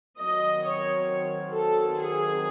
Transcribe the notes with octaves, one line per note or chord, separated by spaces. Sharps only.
D#3 F#3 C4 D#5
C#5
A4
G#4